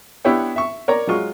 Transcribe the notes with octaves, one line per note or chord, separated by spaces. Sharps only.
B3 D4 E4 G4 C#5 G5
E5 C#6
A#4 C#5 D5 A#5
F#3 G#3 F4 C#6